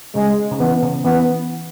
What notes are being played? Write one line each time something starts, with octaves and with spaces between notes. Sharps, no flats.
C#3 G#3
C#3
E3 B3
C#3
E3 B3